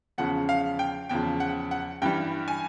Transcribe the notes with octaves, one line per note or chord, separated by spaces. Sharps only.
E2 C#3 F3 F#5
F5
G5
E2 C#3 F3 G5
F#5
F#5
G2 E3 G3 G5
G#5